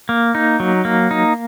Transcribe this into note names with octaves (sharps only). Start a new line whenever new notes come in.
A#3
D#4
F#3
A#3
D#4